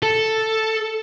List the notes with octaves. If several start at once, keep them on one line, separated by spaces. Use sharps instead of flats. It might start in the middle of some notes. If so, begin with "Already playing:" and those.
A4